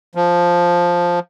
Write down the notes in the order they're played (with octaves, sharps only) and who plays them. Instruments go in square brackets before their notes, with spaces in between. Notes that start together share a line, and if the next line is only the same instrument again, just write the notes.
[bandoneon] F3